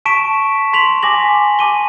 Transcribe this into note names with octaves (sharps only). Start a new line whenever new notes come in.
A5 C#6 B6 D7 E7
C6 B6 F7 F#7
G#5 D6 A#6 F#7
A5 D6 D#7 G7